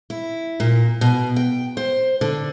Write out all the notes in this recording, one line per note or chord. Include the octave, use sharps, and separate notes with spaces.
E4
A#2
B2
G5
C5
D3